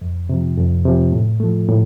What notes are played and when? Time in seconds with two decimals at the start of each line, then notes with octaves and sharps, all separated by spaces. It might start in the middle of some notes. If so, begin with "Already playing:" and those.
0.01 F2
0.29 C3 F3
0.57 F2
0.85 C3 F3
1.12 A2
1.40 F3 A3
1.68 A2